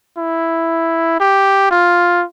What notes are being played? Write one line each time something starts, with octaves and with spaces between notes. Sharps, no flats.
E4
G4
F4